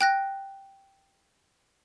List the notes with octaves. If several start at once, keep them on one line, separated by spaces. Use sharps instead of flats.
G5 F#6 A#6